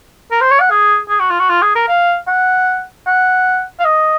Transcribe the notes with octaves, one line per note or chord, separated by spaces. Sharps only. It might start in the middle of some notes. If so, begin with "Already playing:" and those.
A#4
C5
C#5
F#5
G#4
G#4
F#4
F4
F#4
F4
G#4
A#4
F5
F#5
F#5
F5
D#5